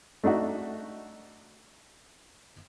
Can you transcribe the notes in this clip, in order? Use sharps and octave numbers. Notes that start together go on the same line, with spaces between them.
A3 D4 D#4 F#4 E5